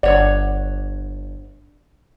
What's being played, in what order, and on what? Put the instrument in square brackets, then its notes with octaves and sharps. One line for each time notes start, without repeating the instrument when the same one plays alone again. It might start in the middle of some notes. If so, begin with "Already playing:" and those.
[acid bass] G1 [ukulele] D4 C#5 F#5 [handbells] D5